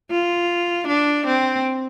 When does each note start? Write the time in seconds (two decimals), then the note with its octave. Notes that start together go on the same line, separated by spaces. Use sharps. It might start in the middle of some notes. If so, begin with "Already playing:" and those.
0.11 F4
0.87 D4
1.26 C4